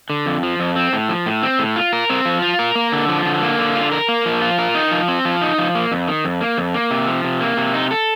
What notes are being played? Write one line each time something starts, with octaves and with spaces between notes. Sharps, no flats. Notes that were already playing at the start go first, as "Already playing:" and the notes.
D3
F2
F3
F2
C4
A2
F3
A2
C4
A2
F4
A#4
C4
F3
F4
A#4
A#3
D3
F3
D3
A#3
D3
F4
A#4
A#3
F3
F4
A#4
D#4
F3
C4
F3
D#4
F3
A#3
F2
D#3
F2
A#3
F2
A#3
C3
F3
C3
A#3
C3
D#4
A4